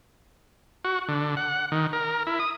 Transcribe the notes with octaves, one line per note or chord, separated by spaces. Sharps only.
F#4
D3
F#5
D#3
A#4
E4
D#6